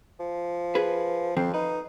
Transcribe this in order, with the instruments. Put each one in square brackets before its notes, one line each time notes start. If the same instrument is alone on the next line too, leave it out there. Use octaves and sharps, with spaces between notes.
[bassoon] F3
[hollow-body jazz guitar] G#4 B4
[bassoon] F2 [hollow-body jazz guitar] F3 C4
[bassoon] D#4 [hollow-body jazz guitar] B4